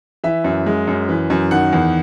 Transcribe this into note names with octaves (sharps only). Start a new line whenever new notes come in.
E3 E5
F#2
G#3
F#2
E3
F#2
D#3 F#5
E2